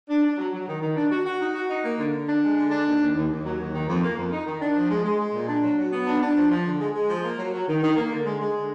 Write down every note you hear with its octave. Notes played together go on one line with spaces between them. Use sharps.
D4
D4
F#3
F#3
D#3
D#3
D4
F#4
F#4
D#4
F#4
D#4
A#3
D3
D3
D4
G#3
D3
D4
D#2
D#2
D#2
D#2
F#3
D#2
D#3
F2
A#3
F2
D#4
D#3
D4
F3
G#3
G#3
G#3
A#2
D4
F#3
F#3
B3
D4
D4
F3
F3
D3
G#3
G#3
F3
A#3
F#3
F#3
D#3
D#3
A#3
D3
G#3
G#3
D3